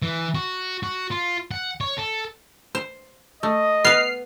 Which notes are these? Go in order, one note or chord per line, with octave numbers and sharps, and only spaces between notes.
E3
F#4
F#4
F4
F#5
C#5
A4
C5
A3 D#5
B3 B4 F6 C7